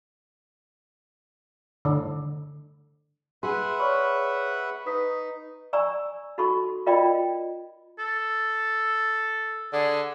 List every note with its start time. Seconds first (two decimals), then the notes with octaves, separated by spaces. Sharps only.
1.85 D3
3.43 G#4 B4 E5 F#5 C6
3.79 C#5 D5 B5 C#6 F6
4.86 D#4 B4 D#6 B6
5.73 D5 G#5 A#5 C#6 E6
6.38 D#4 F#4 A4 B5 C#6
6.86 F4 A#4 D5 D#5 G5 B5
7.98 A4
9.73 D3 G#4